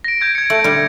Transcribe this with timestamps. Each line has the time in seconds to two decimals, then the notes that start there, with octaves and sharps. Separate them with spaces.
0.04 A#6 D7
0.21 G6 G#6 D7
0.35 G#6 C#7
0.50 A3
0.64 D3 G3